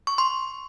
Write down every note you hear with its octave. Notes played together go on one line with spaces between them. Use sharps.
C#6
C6